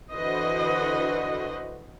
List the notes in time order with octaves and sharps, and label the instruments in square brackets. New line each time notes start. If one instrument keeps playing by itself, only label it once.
[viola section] D3 E3 F#4 B4 C5 D#5